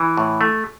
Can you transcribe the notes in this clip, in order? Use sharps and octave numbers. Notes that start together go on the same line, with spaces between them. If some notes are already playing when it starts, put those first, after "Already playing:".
Already playing: E3
A2
A3